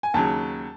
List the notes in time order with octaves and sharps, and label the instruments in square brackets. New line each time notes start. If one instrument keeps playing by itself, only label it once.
[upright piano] G#5
[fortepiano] D#2 C#3 F#3 [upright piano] A5